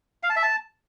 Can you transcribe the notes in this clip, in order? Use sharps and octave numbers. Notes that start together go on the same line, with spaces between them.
F5
A5
E5
A5